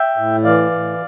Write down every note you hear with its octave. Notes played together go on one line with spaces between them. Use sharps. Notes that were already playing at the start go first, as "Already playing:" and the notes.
Already playing: E5 G5
A2
E3 D5 F5
A2